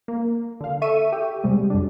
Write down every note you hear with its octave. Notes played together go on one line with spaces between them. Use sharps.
A#3
D3 F5
A4 E5 C#6 D#7
G4
C3 G3 G#3
F#2 D4